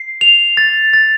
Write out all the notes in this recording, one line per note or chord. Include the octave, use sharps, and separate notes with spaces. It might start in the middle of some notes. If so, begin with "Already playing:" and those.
Already playing: C7
F7
A6
A6